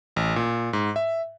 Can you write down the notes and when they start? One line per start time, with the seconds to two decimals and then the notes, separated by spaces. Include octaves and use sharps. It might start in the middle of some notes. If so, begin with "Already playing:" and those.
0.16 A1
0.36 A#2
0.73 G#2
0.96 E5